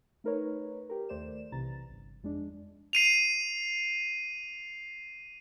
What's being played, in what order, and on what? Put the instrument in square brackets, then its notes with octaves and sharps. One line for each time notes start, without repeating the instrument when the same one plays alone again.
[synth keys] A3 D#4 A#4 B4 C#5
G4 A#4
D#2 A3 C5 D5 E7
B1 C3 E3 A#5 A6
G1
F2 G#3 D4
[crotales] C7 D#7 F7